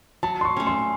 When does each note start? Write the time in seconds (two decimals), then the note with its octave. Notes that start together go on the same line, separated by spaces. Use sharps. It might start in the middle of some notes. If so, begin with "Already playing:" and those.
0.23 F#3 A5
0.41 C6
0.45 C#6
0.57 A3 C#4
0.67 C6